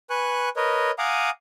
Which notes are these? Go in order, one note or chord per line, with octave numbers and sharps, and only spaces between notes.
B4 G#5 C#6 F#6
A#4 B4 C#5 D#5
F5 F#5 G#5 A#5 D6 D#6